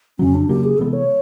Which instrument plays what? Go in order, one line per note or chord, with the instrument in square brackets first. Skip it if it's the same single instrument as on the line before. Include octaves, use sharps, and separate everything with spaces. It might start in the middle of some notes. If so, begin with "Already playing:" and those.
[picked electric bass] F2 C#3 F#3 [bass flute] C#4
[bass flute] D4
[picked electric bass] C#3 F#3 A#3 [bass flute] G4
[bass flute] G#4
[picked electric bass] C3 E3 G#3 B3 [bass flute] A4
[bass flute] C#5